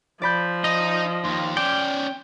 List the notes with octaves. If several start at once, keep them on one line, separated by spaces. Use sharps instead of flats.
F3 D5 B5 G6
D#4 D#5
D#2 C6
C#4 D5 G5